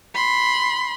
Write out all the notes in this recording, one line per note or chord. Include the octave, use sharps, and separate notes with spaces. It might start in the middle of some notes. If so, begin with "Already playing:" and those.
B5 C6